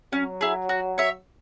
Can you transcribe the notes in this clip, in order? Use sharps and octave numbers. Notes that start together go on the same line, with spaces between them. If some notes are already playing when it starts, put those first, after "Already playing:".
F#3 C#4
E4 G#4
F#4
C#5 E5